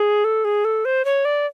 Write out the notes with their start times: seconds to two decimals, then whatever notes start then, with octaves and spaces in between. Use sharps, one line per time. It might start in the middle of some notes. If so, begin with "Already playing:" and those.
Already playing: G#4
0.24 A4
0.45 G#4
0.65 A4
0.85 C5
1.05 C#5
1.25 D5